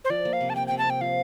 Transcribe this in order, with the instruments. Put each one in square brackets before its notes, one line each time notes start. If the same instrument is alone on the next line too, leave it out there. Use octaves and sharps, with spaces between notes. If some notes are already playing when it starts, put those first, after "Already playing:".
[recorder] C5
[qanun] F3 [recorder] D5
[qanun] A#3
[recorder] F5
[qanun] C3
[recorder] A5
[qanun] A#3 [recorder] G5
[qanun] C3 [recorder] G5
[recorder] A5
[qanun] C3 [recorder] G5
[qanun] F3 [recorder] F5